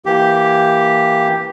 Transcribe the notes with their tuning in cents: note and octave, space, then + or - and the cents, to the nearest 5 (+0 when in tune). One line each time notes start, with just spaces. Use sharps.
E3 +0 A#3 +0 G4 +0